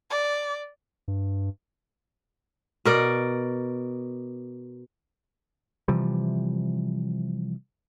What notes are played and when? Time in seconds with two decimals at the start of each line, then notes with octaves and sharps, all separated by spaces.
0.11 D5
1.08 G2
2.85 B2 A#4 D5
5.88 C3 E3 F3 G3